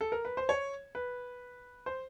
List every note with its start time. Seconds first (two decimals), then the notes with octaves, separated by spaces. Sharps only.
0.01 A4
0.12 A#4
0.25 B4
0.37 C5
0.49 C#5
0.95 B4
1.86 C5